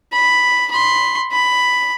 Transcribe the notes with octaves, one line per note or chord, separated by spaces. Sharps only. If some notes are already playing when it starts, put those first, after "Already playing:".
B5
B5 C6
B5